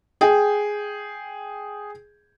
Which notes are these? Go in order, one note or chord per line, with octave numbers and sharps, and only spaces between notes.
G#4 G5